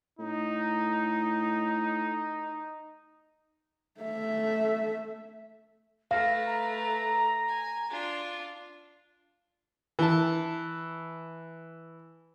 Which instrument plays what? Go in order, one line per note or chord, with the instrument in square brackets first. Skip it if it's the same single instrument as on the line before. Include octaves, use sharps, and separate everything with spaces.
[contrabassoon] A2 [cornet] D#4
[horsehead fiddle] A3 E5
[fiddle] A3 B4 [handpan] F5 [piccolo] A#6
[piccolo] A#5
[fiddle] G#5
D4 F4
[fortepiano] E3 A5